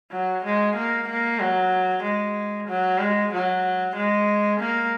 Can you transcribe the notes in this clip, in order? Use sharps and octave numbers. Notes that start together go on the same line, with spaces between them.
F#3
G#3
A#3
A#3
F#3
G#3
F#3
G#3
F#3
G#3
A#3